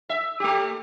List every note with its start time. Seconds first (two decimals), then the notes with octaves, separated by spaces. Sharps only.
0.09 E5
0.40 A3 G4